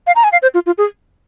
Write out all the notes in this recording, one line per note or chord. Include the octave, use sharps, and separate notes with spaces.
F5
A#5
G#5
F5
C5
F4
F4
G#4